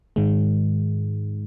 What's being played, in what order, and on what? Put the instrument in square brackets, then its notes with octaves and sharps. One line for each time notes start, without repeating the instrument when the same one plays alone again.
[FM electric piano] G#2 D#3 G#3